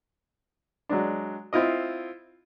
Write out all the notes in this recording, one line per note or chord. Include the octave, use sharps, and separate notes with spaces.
F#3 G#3 D4
C4 E4 F4 D#5